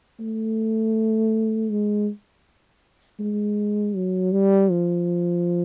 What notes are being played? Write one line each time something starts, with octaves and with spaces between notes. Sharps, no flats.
A3
G#3
G#3
F#3
G3
F3